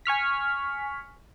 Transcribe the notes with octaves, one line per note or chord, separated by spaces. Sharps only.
G#5 C#6 F6 B6